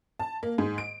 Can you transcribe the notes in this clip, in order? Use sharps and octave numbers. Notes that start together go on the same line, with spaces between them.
A5
A#3
G#2
D7